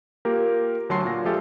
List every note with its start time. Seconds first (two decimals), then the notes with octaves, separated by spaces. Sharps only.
0.25 A#3 F4 G4 A#4
0.89 D2 F#3 A5 C6 C7
1.05 A#2 F#4 A#6
1.24 F3 G#3 F4 G4 A4 E5